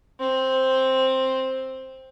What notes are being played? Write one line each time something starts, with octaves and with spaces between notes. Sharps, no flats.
C4